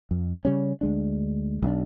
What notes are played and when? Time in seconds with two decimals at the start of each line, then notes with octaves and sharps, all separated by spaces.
0.11 F2
0.45 C#3 G3 C#4
0.81 D2 G#3 D4
1.62 B1 F3 D4